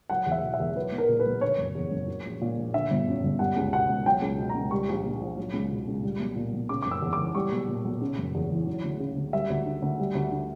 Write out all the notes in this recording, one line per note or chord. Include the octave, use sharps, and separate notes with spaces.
F#3 F#5
E2
E5
B2
E5
E2
F#3 B4
B1
A#4
A#2
B4
B1
D3 C#5
F#1
E2
F#1
F#3
A#1
A#2
A#1
D3 E5
G1
F#2
G1
G3 F#5
C#2
B2 F#5
C#2
F#3 G5
C#2
B2
A#5
C#2
G3 C#6
A#1
A#2
A#1
F#3
C#2
B2
C#2
G3
B1
A#2
B1
C#3 D6
D6
F#1
E6
E2
D6
E3
G3 C#6
B1
A#2
B1
C#3
F#1
E2
E3
F#3
D2
C#3
D2
G3 E5
D2
D3
D2
G3
D2
D3